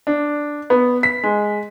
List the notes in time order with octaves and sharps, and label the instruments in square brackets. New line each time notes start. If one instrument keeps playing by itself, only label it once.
[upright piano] D4
B3
B6
G#3